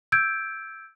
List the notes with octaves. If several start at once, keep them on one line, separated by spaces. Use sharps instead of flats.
E6 G6 G#6 D7